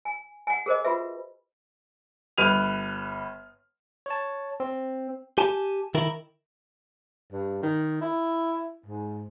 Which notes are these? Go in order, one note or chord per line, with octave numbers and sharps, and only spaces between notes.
G#5
F#5 G#5
G#4 A#4 C5 D#5
F4 F#4 B4 E5
G1 B4 F6 D#7 F7
C#5 A5
C4
G4 G#5 A5
D#3 E4 A#4
G2
D#3
E4
G#2